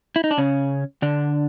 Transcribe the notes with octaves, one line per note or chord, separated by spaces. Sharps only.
E4
D#4
D4
C#3 C#4
D3 D4